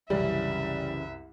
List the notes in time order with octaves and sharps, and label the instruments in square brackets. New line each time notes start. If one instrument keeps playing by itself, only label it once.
[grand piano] C2 F#2 [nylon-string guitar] C#3 E3 C#4 [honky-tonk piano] G3 [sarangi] E5